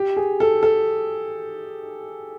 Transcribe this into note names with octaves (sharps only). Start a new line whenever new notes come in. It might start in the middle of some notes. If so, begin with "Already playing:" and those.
Already playing: G4
G#4
A4
A4